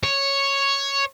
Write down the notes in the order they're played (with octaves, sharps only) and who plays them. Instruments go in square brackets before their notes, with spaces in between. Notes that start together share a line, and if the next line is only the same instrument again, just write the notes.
[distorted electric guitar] C#5